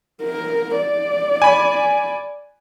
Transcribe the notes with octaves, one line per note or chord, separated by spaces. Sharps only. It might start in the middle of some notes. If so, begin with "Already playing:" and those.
A#4
D5
G#5 B5